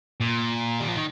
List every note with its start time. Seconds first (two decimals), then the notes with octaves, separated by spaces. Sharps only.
0.21 A#2
0.80 G3
0.88 F3
0.96 D#3